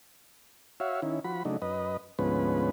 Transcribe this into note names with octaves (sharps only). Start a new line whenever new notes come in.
F#4 C#5 E5 F5
D#3 C#4 E4
F3 F#4 B5
C#3 F#3 A3 D4 D#4
F#2 B4 D#5
D2 G#2 F3 B3 C#4 B4